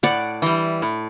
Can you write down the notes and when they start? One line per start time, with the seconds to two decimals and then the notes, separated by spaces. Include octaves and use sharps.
0.03 A2 D5 F#5
0.42 E3 G3
0.82 A2